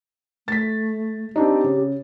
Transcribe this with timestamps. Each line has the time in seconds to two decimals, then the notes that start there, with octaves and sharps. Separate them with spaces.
0.48 A3 A6 B6
1.36 C4 D4 D#4 G4
1.64 C#3